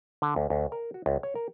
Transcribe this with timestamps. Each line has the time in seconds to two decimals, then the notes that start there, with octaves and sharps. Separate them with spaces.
0.22 D3
0.36 D2
0.50 D2
0.72 A#4
0.94 F#4
1.06 C#2
1.23 C#5
1.35 A#4